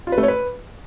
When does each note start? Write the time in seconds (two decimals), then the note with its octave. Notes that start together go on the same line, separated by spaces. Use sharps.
0.07 F4
0.12 B4
0.18 A3
0.23 C#5
0.28 B4